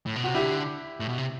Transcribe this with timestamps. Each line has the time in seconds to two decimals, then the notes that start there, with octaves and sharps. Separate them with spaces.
0.06 A2
0.16 B2
0.24 C3 F#4
0.34 D3 E4 G4
1.00 A2
1.09 B2
1.18 C3